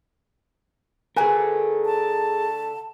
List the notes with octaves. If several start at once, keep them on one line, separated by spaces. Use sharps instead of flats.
D3 A3 G#4 A#4 B4 G#5
A5